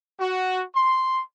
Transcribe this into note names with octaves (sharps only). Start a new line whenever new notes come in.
F#4
C6